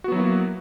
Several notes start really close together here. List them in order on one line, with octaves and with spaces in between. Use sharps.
F#4 B3 F#3 E4 A#3